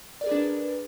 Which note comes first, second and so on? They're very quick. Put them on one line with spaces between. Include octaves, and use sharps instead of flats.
D5 A#4 G#4 B4 D4